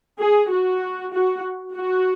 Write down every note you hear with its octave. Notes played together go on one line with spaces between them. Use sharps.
G#4
F#4
F#4
F#4